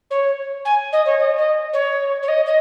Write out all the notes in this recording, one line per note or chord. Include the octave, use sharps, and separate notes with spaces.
C#5
G#5
D#5
C#5
D#5
D#5
C#5
C#5
D#5
D#5